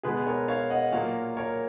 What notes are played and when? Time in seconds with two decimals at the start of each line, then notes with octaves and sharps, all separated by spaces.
0.03 B2 G#3 G#4 B4
0.27 A#4 C#5
0.48 C#5 F5
0.70 D#5 F#5
0.92 A#2 F#3 A#3 C#5 F5
1.37 A#4 C#5